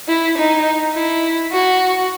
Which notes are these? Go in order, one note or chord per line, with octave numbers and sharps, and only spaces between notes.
E4
D#4
E4
F#4